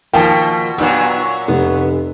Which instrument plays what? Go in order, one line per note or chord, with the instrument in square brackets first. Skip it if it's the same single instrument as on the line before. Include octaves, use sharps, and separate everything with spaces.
[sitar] B2 [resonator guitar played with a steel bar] D#3 F3 A#3 [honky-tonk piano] G5 A5
[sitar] A#2 F#3 [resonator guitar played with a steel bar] B3 D#4 G4 [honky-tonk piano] E6
[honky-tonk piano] F1 [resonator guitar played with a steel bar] B3